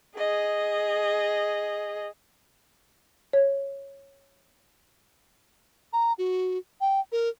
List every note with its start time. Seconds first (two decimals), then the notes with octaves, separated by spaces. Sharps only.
0.17 G#4 D#5
3.33 C#5
5.93 A#5
6.18 F#4
6.81 G5
7.12 A#4